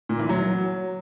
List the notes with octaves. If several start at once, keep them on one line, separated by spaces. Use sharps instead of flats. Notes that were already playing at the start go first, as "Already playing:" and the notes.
A#2
E3
F#3